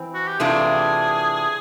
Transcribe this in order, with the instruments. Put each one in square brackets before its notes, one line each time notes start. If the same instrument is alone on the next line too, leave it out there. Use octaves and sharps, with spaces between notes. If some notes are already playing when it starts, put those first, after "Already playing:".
Already playing: [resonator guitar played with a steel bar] E3 C4
[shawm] F#4
G4
[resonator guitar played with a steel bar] C3 E3 A3 D4 F4 [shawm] G#4